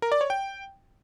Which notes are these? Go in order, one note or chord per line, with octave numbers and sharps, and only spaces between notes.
A#4
D5
C#5
G5